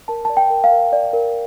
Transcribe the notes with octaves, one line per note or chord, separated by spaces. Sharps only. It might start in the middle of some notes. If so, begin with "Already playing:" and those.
A#4 A5
D5 A5
G5
A#4
F5
A#4
D5
A#4